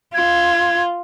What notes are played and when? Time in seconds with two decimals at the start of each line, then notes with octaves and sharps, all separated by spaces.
0.14 F4 G#6